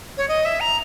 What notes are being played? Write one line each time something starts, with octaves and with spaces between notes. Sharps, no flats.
C#5
D#5
E5
A#5